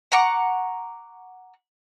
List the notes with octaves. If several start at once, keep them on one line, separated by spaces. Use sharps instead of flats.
F#5 A#5 C#6 D6